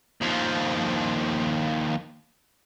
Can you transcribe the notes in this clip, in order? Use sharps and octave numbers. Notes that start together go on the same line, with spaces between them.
D#2 F3